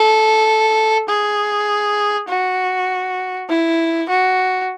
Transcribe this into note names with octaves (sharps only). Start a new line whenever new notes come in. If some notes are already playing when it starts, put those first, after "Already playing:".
Already playing: A4
G#4
F#4
E4
F#4